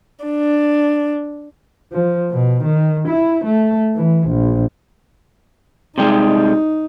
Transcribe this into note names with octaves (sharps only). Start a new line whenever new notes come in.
D4
F3
B2
D#3
E4
A3
E3
A#1
C3 G3 G#3 D#4